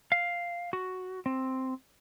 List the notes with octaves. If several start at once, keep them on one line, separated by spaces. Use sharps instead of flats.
F5
F#4
C4